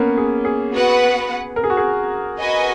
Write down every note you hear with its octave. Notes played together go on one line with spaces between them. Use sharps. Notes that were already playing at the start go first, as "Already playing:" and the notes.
Already playing: A#3 B3 C#4
G#4
G#4
B3 F#4 B4 F#5
A#4
G#4
F#4
G#4
F#4 B4 D#5 G#5